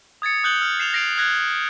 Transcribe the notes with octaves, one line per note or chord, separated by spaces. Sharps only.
D#6 G#6 A6 C#7
D#6 F#6 G6 F#7 G7
F6
F6 C7 E7 F7 G7
F6 A#6 C7 D7 F7
F6 F#6 G#6 A#6 C7